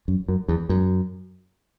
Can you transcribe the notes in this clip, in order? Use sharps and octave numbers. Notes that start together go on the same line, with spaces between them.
F#2
F#2
E2
F#2